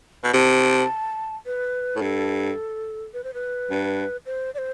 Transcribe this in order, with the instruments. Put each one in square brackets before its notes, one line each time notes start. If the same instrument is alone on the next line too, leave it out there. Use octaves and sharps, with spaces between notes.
[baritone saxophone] B2
[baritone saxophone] C3 [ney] A5
[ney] B4
[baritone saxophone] A2
[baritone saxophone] G2 [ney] A4
[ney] B4
C5
B4
[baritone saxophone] G2
[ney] C5
D5
C5